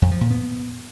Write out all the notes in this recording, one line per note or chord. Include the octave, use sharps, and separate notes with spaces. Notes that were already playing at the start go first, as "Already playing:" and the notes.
F2
F3
A#2
B3